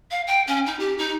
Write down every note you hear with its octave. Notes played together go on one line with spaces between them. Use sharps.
F5
G5
C#4
D#4
G4
D#4